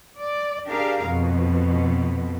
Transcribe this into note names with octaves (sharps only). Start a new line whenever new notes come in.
D5
D4 G4 G#4 A#4 F5
F2 B2